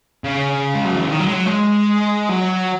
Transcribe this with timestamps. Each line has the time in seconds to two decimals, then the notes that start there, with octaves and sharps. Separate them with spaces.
0.24 C#3
0.75 G#3
0.85 F#3
0.96 E3
1.06 D#3
1.20 F#3
1.28 G#3
1.34 F#3
1.46 G#3
2.30 F#3